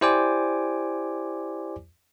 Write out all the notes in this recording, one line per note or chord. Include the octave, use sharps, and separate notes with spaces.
E4 G4 C5 D5 G#5 D6